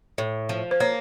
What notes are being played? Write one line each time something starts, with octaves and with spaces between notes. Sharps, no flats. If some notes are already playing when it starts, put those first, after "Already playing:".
A2
F3
C5
A#3 C#5